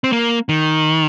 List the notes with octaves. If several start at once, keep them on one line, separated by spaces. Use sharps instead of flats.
C4
A#3
D#3